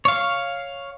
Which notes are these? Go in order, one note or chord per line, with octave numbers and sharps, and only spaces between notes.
C#5 F5